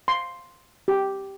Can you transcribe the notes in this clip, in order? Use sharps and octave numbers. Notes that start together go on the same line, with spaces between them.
C6
G4